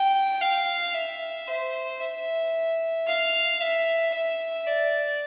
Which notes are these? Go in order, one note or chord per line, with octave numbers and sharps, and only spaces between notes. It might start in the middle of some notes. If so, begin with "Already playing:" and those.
Already playing: G5
F5
E5
C5
E5
F5
E5
E5
D5